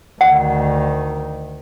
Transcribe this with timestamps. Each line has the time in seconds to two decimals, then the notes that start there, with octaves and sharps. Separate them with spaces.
0.21 D2 D#3 F#5